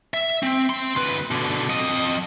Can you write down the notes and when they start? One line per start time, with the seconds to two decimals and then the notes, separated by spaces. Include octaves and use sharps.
0.14 E5
0.43 C4
0.70 C4 C6
0.95 D2 B4
1.31 B2 D3
1.69 F2 D#5